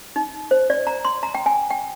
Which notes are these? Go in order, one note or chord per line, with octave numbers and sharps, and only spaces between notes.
D#4
C5
D5
A#5
C6
A#5
G5
G#5
G5